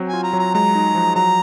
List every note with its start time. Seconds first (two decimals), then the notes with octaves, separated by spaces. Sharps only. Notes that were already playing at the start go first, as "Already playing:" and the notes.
Already playing: F#3 C4
0.09 F4 G#5
0.23 A#5
0.33 F#3
0.39 A#5
0.54 G#3 A#5
0.75 D#4
0.95 F3
1.16 F#3 A#5